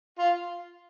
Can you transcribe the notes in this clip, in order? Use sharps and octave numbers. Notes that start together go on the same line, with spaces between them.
F4